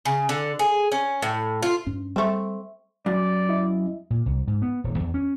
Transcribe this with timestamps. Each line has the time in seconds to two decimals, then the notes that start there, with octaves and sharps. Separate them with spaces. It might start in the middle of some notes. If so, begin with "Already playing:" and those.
0.05 C#3
0.29 D3
0.59 G#4
0.92 C#4
1.22 A2
1.63 F4
1.87 G2 C#4
2.16 G3 A3 C4
3.06 F#2 D5
3.49 E4 D#5 E5
4.10 A#2
4.26 C2
4.47 G#2
4.62 B3
4.84 D#1
5.00 E2
5.14 C#4